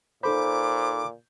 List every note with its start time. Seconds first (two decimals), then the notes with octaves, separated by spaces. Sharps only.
0.23 A#2 D#4 A4 C5 B5 D6